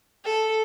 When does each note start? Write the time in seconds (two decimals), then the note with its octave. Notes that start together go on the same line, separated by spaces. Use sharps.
0.25 A4